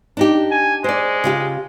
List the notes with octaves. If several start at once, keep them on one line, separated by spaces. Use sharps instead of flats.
D4 D#4 G4
G#5
G#3 C5 D5
C#3 F4 G4